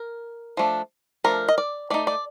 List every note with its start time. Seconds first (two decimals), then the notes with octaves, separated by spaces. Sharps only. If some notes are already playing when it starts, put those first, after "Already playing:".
Already playing: A#4
0.57 F3 A3 D4
1.24 F3 A3 D4 A#4
1.48 D#5
1.58 D5
1.90 A3 D#4 D5
2.07 D5